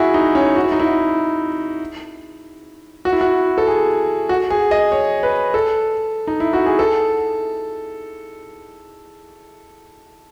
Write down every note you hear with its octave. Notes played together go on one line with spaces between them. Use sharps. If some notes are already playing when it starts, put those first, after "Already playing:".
Already playing: E4 F#4 G#4
D#4
C#4
F#4
E4
D#4
E4
F#4
E4
F#4
A4
G#4
F#4
G#4
D#5
C#5
B4
A4
D#4
E4
F#4
G#4
A4